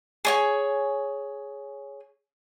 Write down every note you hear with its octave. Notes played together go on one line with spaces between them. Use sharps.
G#4 C#5 G#5